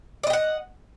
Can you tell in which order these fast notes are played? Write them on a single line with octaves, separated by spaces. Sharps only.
D5 D#5 G5 F#5